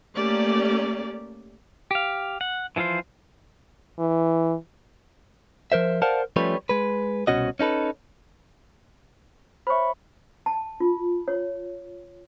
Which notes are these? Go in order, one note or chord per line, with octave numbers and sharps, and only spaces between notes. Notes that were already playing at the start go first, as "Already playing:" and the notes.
A3 A#3 C#4 G4 D5
G4 F5
F#5
E3 F3 E4 F4 C5
E3
F3 A#4 C5 E5
A#4 C5 D5 F5 F#5 A5
F3 G3 A3 C#4 B4 C#5
G#3 B4
C2 B2 C#4 F#4 D#5
C#4 D#4 A4 B4
C5 C#5 E5 B5 C#6
A5
F4
C#5